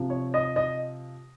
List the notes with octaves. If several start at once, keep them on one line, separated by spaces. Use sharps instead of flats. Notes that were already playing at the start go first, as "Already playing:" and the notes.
Already playing: C3 F3
C#5
D#5
D#5